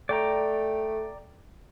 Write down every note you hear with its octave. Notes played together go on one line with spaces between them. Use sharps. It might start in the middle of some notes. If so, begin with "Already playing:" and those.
A3 D5 G5 A#5